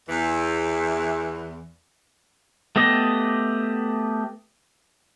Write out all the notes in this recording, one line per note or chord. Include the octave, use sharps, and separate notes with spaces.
E2 E3
A3 B3 G4 D#5